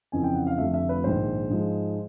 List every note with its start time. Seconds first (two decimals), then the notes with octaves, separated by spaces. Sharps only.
0.12 F2 C#3 E3 G#5
0.24 G5
0.35 F#5
0.47 F5
0.58 F1 F2 D3 F3 A3 E5
0.74 E5
0.89 B4
1.04 A#1 G#2 D#3 G#3 C5
1.50 G#2 F3 G#3